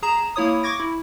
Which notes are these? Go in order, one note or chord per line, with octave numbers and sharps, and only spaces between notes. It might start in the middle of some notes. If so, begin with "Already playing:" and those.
G#4 A#5 E7
A#3 E4 C#5 D#6
C#6 D6 G#6 A#6 D7
E4